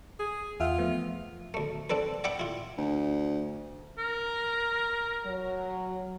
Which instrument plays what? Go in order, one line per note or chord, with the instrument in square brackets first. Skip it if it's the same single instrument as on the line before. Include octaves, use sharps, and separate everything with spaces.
[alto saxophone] G#4
[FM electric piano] E2 E5 F#5 [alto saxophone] F4
[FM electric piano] F3 A3 B3
[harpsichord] D2 A3
C4 D4 A4 B4
D5 E5 F#5 G5 B5 D6
E4 F4
[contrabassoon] D2
[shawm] A#4
[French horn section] F#3